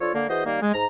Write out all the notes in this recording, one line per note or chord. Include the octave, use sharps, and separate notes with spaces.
F3 D4 F4 A4 C#5
D3 A#3
E3 F#4 G#4 C5 D#5
D#3 G3 A#3
G#3
G#2 A#5